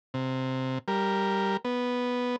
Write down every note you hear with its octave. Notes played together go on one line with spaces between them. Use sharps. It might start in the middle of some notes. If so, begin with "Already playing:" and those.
C3
G3 A#4
B3